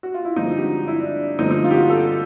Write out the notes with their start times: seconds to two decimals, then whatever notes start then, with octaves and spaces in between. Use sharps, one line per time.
0.03 F#4
0.14 F4
0.25 E4
0.36 G2 D3 F3 G#3 C4 D#4
0.57 G4
0.62 F#4
0.87 E4
1.00 D4
1.39 G2 D3 F3 A3 C4 D#4
1.51 D#4
1.64 F4
1.71 G4
1.76 F#4
1.90 A4